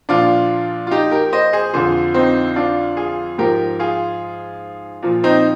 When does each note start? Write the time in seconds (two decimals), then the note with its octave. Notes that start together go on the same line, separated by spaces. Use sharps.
0.09 A#2 F3 D4 F4
0.87 F4
0.91 D#4 G4
1.11 G4 A#4
1.33 C5 D#5
1.53 G#4 C5
1.73 F2 D3 F3 G#4 C5
2.14 C4 D#4
2.56 D4 F4
2.97 F4 G#4
3.38 G#2 F3 G4 A#4
3.79 F4 G#4
5.02 A#2 F3
5.24 C4 D#4